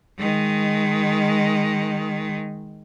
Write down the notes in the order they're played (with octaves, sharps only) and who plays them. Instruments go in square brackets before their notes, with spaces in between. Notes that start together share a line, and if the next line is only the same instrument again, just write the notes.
[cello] D#3 G#3